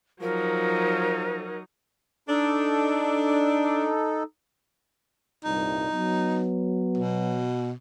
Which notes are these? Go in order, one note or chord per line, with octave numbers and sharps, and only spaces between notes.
F3 F#3 D#4 A#4
D4 D#4 A4
C2 G2 A#2 D#4
F#3 B3
B2